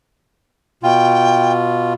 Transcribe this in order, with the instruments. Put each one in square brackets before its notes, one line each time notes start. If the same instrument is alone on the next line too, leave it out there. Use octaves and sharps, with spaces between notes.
[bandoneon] B2 F4 [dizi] G5